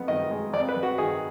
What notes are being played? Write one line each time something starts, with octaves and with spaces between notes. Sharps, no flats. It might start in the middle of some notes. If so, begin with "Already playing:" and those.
Already playing: F2 B3
D#3 D#5
G#3
F2 D5
B4
F2
F#4
D#3 G#4